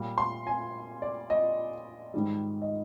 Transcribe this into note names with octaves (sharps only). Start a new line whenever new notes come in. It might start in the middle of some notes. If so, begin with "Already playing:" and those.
Already playing: A#2 G3
C6
G#5
D5
D#5
G#2 D#3 G3
D#5